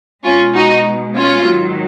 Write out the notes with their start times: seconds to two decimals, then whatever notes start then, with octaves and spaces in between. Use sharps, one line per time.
0.24 B2 G#3 C#4 F4
0.54 D#4 F#4
1.16 C#4 F4
1.47 G#2 D#3 F#3